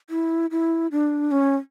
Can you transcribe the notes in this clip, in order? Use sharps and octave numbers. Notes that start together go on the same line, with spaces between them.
E4
E4
D4
C#4